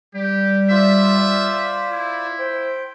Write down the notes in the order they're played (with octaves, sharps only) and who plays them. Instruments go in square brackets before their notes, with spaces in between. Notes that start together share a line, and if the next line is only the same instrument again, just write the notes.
[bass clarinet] G3 [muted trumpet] G4
[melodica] F4 C5 D5 [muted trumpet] E5
[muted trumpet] E4
[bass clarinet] C5 [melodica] G5